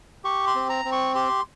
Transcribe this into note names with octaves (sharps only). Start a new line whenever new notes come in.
G4 C#6
C6
C4
A#5
C4
C#6
G4 C6